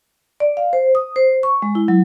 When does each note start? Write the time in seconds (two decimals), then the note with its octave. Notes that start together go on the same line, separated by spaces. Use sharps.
0.40 D5
0.57 F5
0.73 C5
0.95 D#6
1.16 C5
1.43 C#6
1.62 G#3
1.75 E4
1.88 F#3